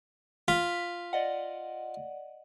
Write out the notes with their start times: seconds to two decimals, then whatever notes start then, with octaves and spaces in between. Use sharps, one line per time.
0.48 F4 B6
1.13 D5 D#5 F#5